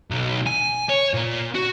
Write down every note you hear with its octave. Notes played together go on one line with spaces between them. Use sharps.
B1
G#5
C#5
A#2
F#4